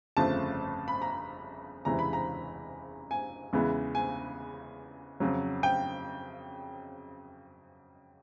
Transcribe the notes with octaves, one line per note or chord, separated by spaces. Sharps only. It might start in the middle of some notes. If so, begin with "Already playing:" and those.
G1 F2 C#3 F3 A3 A5
B5
A#5
F#1 E2 C3 E3 G#3 A#5
B5
A#5
G#5
E2 C#3 E3 G#3 B3
G#5
F2 C#3 F#3
G5